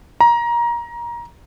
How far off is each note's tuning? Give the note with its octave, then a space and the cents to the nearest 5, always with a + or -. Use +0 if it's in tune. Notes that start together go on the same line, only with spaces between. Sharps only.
A#5 +20